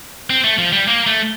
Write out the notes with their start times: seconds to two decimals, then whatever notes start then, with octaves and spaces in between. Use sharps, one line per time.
0.30 C4
0.44 A3
0.58 F3
0.72 G3
0.88 A#3
1.06 A3